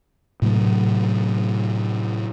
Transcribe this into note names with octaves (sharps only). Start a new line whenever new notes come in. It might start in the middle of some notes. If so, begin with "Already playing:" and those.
A2 C3 F#3 A3